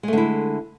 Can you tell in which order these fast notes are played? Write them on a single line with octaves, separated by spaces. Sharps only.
G#3 A3 D3 E4